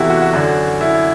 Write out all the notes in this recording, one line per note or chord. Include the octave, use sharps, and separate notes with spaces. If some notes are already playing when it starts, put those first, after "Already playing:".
Already playing: E2 C3 E3 E4 F#4 G4 A4
F#4
F#4
F#2 D3
E4